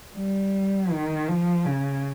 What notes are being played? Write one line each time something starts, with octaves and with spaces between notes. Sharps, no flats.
G3
D#3
F3
C#3